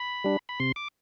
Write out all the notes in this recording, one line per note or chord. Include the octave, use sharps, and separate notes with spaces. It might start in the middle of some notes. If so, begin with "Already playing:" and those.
Already playing: B5
G3 D4
B5
C3 C6
D6